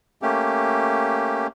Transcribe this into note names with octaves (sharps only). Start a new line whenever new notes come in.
A3 A#3 C#4 G4